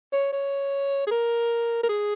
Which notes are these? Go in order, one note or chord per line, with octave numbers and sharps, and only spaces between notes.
C#5
C#5
G#4
A#4
A#4
G#4